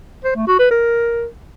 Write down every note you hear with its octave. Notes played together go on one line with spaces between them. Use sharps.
C5
A3
F#4
B4
A#4